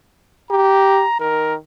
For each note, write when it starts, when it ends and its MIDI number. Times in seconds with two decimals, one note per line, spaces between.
0.51 1.05 67
0.51 1.15 82
1.20 1.56 51
1.20 1.54 70